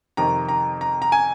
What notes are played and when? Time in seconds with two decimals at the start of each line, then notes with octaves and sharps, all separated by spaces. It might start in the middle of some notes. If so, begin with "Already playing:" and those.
0.17 F2 C3 D#3 A#5
0.48 A#5
0.81 A#5
1.02 A#5
1.12 G#5